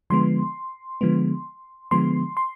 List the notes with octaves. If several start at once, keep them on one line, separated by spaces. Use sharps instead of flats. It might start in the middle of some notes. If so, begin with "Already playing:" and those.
D3 F3 G#3 B3 C6
D3 F3 G#3 B3
D3 F3 G#3 B3 C6
C6